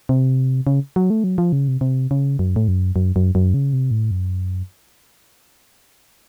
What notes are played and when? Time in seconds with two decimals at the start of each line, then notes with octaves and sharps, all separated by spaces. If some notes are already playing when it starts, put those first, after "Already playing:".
0.09 C3
0.67 C#3
0.96 F#3
1.10 A3
1.24 F#3
1.38 F3
1.52 C#3
1.68 C3
1.81 C3
2.11 C#3
2.39 F#2
2.56 A2
2.68 F#2
2.96 F#2
3.16 F#2
3.35 F#2
3.54 C#3
3.73 C3
3.91 A2
4.11 F#2